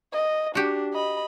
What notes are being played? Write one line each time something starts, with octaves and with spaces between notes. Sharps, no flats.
D#5
D4 F#4 G4
D#5 B5